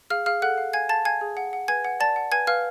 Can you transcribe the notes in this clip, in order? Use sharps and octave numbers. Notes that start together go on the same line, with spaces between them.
G#4 F5 F6
G#4 F5 F6
A4 F#5 F#6
F5
F5 G#5 G#6
F5 A5 A6
F5 G#5 G#6
G#4
F#5
F#5
B4 G#5 G#6
F#5
D5 A5 A6
F#5
B4 G#5 G#6
B4 F5 F6